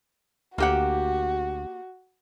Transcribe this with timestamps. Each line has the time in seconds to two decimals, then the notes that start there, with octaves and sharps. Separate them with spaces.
0.58 D2 A#3 F#4 G4 F#5